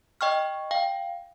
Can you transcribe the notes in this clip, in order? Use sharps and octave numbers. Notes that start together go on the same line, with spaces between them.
D#5 G5 C#6 F6
F5 G5